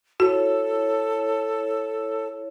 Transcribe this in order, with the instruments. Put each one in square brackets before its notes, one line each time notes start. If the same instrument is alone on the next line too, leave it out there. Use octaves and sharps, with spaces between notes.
[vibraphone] E4 C#5 [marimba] F#4 [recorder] A4